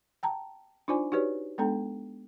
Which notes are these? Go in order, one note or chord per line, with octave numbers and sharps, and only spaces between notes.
G5 A5 A#5
D4 D#4 F4 C5 D5 G#5
D#4 F#4 G4 B4 C#5 D5
G#3 B3 D4 A4 G5 A#5